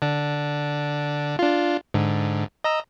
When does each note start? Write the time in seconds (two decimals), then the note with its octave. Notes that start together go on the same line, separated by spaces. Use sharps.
0.02 D3 D4
1.39 D4 F4
1.94 G#2 D3
2.64 D#5 A#5 E6